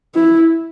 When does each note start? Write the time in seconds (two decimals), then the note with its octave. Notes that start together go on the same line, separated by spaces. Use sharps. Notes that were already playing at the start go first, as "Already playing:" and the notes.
0.15 E4